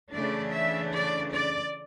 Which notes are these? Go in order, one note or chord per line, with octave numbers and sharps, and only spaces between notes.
C#3 E3 A3 D4 D5
E5
D5
D5